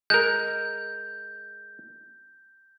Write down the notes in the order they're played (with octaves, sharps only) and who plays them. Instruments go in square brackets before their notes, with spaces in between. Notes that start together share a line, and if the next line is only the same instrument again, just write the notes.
[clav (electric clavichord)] G#3 A#4 [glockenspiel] G6